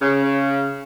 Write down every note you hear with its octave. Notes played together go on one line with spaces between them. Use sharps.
C#3